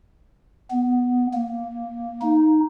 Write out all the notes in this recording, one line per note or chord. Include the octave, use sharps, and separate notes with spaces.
B3
A#3
D#4